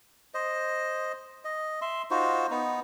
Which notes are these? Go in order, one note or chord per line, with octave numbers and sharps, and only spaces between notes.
C5 D#5
D#5
E5 C6
D#4 F4 F#4 C5
B3 D#4